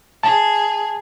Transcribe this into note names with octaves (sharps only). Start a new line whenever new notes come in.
G#4 A5